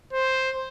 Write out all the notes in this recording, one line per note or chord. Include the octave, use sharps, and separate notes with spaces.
C5